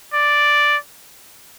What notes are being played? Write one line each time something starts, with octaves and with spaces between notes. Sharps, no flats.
D5